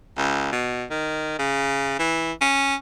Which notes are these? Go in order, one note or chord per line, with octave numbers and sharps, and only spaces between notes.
C#2
B2
D#3
C#3
E3
C#4